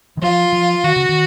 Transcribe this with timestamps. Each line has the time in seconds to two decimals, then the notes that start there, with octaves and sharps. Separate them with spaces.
0.17 D#3
0.22 F3 F4
0.52 F3
0.84 D#3 F#4
0.96 C#3
1.09 D#3